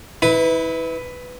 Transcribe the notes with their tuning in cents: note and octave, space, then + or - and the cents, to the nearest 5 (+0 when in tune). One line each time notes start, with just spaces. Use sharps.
E4 -30 B4 +10